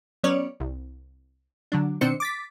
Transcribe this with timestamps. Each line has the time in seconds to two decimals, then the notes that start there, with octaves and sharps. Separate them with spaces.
0.24 F#3 B3 C#4 C#5 D5
0.60 C2
1.72 D3 F#3 D4
2.01 B2 D#3 C4 D4 C5 C#7
2.20 D6 A6 B6